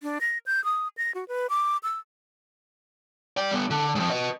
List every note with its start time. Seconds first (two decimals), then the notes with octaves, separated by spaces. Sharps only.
0.03 D4
0.21 A#6
0.46 G6
0.64 D#6
0.98 A#6
1.15 F#4
1.28 B4
1.50 D6
1.83 E6
3.37 D5 G5
3.51 G3 B3
3.70 D3
3.95 F2 G#2
4.10 B4 D#5